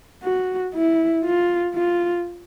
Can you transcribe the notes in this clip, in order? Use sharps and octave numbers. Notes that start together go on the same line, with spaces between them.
F#4
E4
F4
F4